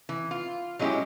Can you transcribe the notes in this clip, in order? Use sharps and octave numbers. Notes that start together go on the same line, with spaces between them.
E3
F4
F#3 G#3 C#4 D#4 E4 G4